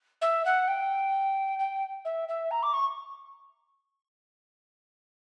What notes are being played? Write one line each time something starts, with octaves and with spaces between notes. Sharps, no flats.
E5
F#5
G5
G5
E5
E5
A#5
D6
C#6